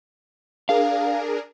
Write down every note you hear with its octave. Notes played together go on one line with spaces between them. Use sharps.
D4 G#4 A#4 F5